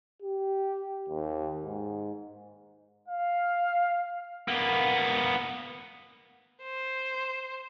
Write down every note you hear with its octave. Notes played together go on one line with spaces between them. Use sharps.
G4
D#2
G#2
F5
A#3 B3
C5